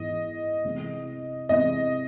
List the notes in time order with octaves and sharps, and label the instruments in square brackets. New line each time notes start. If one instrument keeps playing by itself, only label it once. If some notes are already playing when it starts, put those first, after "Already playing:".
Already playing: [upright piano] G#2 E3 G#3 B3 E4 [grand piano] D#5
[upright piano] C3 E3 G#3 C4 E4
[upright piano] C3 E3 G#3 C4 E4 [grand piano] D#5